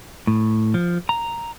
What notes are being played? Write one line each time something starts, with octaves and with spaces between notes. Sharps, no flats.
A2
F3
A#5